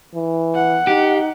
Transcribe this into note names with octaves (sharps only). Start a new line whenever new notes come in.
E3
F#5
D#4 G4